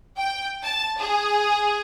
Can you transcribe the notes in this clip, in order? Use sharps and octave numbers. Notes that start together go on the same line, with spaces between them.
G5
A5
G#4